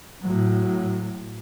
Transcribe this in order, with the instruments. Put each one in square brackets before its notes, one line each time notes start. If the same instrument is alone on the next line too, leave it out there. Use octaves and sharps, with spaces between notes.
[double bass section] A2 F#3